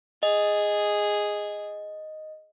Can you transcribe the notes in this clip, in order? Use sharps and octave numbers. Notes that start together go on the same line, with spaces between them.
G#4 D#5